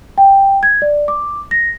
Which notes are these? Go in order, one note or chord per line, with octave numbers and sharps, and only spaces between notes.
G5
G#6
D5
D6
A#6